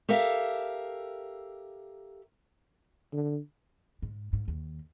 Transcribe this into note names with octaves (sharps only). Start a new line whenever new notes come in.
G4 A4 A#4 E5 F5
D3
G#2
G#2
D#2